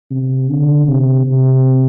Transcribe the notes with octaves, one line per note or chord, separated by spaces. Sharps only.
C3
D3
C3
C3